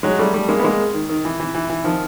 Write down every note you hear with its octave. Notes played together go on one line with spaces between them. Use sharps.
F#3 G#3
G3 A3
G3 A3
G#3 A#3
B3
G#3 A#3
D#3
D#3
E3
E3
E3
E3
D#3 F3